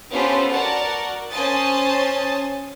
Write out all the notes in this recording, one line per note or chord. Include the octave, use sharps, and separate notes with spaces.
B3 C#4 F4 G4 A4 C5
F#4 A#4 D5 F#5 A5
C#4 C5 G#5 A5 D#6 A6